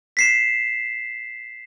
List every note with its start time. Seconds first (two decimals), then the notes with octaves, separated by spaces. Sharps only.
0.17 B6 C7 E7